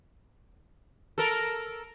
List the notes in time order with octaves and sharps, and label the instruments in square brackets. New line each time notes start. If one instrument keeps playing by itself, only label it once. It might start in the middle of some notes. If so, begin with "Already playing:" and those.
[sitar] A4 A#4